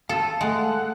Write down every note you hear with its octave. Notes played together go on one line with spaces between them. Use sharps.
A4 F5 A5
G#3 A3 F#5